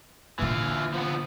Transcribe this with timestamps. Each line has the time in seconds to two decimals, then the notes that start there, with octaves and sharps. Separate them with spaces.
0.39 A#2 D3 E3 F4
0.94 F3 B3